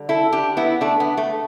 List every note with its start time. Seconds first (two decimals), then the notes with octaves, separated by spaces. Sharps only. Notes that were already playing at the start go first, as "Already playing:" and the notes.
Already playing: D3 G3
0.09 E4 A4
0.33 D4 G4
0.57 B3 E4
0.81 A3 D4
1.00 B3
1.17 A3